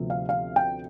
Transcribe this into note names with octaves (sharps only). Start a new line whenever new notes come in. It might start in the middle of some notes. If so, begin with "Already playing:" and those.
Already playing: D2 C3 F3 B3
F5
F5
G5